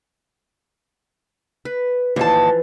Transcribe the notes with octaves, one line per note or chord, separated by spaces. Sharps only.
B4
D#2 E3 F3 A5